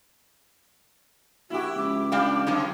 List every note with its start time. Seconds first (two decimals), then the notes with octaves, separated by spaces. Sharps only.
1.50 A#1 E4 F#4 G4
1.76 C#2 D6
2.12 G3 D4 F5 G5
2.47 F#2 D#3 G#3 F4